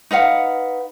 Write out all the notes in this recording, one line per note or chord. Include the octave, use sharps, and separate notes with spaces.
D#4 B4 F5 F#5